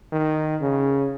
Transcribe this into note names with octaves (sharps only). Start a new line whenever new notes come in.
D#3
C#3